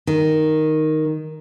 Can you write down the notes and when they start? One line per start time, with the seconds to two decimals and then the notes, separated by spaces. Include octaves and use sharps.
0.07 D#3